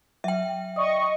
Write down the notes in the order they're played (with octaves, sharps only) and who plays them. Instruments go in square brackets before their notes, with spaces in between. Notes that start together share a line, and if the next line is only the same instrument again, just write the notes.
[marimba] F#3 [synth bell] E5 G5
[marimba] D5 D#6 [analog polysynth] D#5 C#6